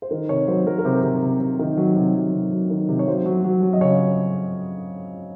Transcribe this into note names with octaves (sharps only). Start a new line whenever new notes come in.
C5
D#3 A#4
C3 C#5
F#3 C5
F#3 A#4
A#4
C3 C5
C3
C3
C3
D#3
F#3
C3
F#3
C3
F#3
D#3
C3
C#5
F#3 C5
F#3
F#3
F#3
D#5
C#3 C#5